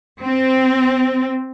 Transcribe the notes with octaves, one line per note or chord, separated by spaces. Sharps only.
C4